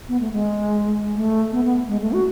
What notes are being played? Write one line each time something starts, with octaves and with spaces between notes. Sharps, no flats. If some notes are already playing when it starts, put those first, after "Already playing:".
B3
A3
G#3
A3
B3
B3
G#3
A3
F#4